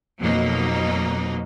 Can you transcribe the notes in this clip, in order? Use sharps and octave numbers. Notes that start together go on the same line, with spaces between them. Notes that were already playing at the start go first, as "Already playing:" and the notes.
F2 B2 F#3 A#3 D#4